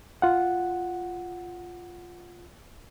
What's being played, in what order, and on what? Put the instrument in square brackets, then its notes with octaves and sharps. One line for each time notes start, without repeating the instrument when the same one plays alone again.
[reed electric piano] F4 F#5